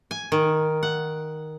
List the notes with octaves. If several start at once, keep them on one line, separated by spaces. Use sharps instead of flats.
G#5
D#3
F#5